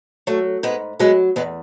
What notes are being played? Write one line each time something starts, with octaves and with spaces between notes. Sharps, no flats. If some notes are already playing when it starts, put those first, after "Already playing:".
F#3 A3
G#2 G#3 B3
F#3 G#3 B3
E2 G#3 B3